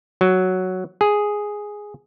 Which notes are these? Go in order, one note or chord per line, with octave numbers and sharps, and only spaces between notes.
F#3
G#4